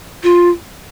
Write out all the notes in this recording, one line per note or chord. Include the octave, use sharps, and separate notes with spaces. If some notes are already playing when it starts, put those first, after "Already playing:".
F4